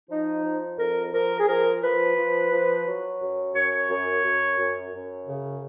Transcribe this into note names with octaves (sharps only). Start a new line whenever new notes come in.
F3 D#4
F3
F2 A#4
F3 A#4
G#4
F3 A#4
F3 B4
F3
F3
F#3
F#2
F#2 C#5
F#2
F#2
F#2
F#2
C#3